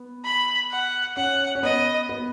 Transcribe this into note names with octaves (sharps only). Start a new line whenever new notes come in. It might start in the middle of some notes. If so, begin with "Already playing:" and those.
Already playing: B3
B5
F#5
C#4 F#5
C#4
B3 D#5
B3